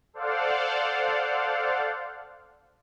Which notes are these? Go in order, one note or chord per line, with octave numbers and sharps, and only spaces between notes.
A4 C5 D5 F5 F#5